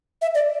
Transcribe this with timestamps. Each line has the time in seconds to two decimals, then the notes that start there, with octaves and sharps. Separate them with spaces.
0.22 E5
0.35 D5